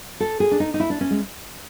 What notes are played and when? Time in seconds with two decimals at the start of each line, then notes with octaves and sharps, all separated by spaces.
0.20 A4
0.40 G#4
0.51 D4
0.60 D#4
0.74 D#4
0.80 E4
0.90 D4
1.01 C#4
1.10 G#3